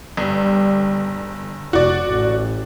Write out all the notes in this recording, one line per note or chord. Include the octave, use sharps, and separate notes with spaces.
G1 G3
F1 F#4 D5
A1